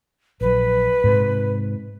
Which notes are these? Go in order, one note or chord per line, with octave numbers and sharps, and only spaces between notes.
A#1 F#3 B4
G#2 C3